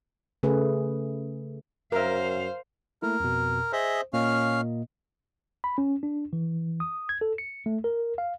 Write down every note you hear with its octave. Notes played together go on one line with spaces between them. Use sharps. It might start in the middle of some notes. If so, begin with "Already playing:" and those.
C#3 A3 G#4 B4
F#2 A#4 C5 E5 F5
A3 A#3 E4 A#4
F2 B2
G#4 C5 D#5 E5
A#2 A#3 C#4 D#5 F5 F6
B5
C#4
D4
E3
D#6
G#6
A4
C#7
A3
A#4
F5